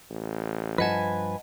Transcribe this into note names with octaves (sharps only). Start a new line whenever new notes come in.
A1
G2 F3 B4 D#5 F#5 G#5 A5